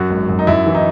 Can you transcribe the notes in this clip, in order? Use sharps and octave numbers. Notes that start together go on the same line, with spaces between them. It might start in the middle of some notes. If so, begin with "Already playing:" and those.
Already playing: F#2 F#4
G#1
F#2
D#4
F#2 E4
E3
D#4